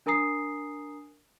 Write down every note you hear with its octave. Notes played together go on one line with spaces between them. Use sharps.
D4 A#4 G#5 A#5 D#6 C7